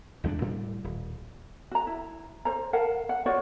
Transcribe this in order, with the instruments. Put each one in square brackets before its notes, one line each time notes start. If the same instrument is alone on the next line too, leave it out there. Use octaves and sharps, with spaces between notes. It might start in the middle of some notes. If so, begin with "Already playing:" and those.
[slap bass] G#1 E2 G#3 D4
A2 G3
D#1
[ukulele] F#4 A#5
E4
C5 A#5
A#4 F5 F#5 A5
F#5
F4 F#4 C#5 D5